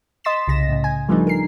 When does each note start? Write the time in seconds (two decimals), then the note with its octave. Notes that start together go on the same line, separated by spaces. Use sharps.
0.24 D#5 C6 A6 B6 E7
0.48 C2 C#3 A#6 E7
0.69 A2 C#3
0.84 G#5
1.09 F3 G3 A3 B3 D4 D#4
1.27 A#4 C7